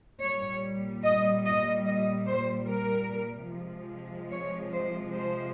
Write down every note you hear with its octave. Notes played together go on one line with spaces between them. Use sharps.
A#2 G3 C#5
D#5
D#5
D#5
C5
A#4
C3 F3 G#3
C#5
C5
C5